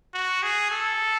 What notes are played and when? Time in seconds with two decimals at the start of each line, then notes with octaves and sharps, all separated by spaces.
0.14 F#4
0.43 G#4
0.71 A4